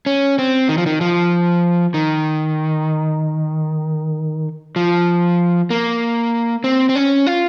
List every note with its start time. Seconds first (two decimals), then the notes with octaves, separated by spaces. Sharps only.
0.06 C#4
0.39 C4
0.69 D#3
0.78 F3
0.86 D#3
1.01 F3
1.94 D#3
4.76 F3
5.70 A#3
6.64 C4
6.89 C4
6.96 C#4
7.27 F4